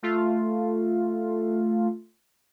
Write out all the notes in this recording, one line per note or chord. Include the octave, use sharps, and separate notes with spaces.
A3 F4